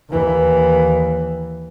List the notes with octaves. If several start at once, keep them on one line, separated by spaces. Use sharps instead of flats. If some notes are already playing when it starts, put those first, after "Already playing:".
D#2 E3